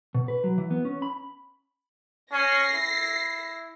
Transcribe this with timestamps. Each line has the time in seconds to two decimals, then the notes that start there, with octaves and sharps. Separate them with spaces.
0.15 B2
0.28 B4
0.44 F#3
0.58 E3
0.71 B3
0.85 C#4
1.02 B5
2.32 C#4 A#6 C7
2.75 E4